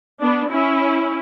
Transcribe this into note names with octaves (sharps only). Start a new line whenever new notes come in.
B3 D4
C#4 E4